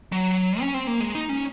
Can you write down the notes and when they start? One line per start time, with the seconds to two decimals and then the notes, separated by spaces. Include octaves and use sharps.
0.12 F#3
0.61 C#4
0.74 C4
0.87 A#3
1.00 G#3
1.15 D#4
1.29 C#4